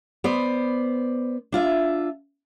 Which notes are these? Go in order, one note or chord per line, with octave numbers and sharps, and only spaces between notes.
B3 C5 D5
D4 F4 E5